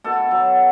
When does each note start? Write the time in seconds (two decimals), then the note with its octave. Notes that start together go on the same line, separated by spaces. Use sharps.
0.04 B2 A4 A5
0.31 F#3